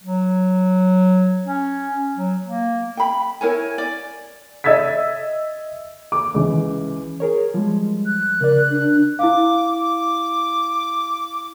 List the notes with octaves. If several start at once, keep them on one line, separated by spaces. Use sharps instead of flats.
F#3
C#4
F#3
A#3
G5 B5
E4 A#4 C#5 G#5
D5
D#5 E5 E6 G#6 A6 B6
D6
C#2 E3
G#4 A#4 C#5
F3 G3 G#3
F#6
C#3 A#4 D5
D4
E4 F5 D6
D6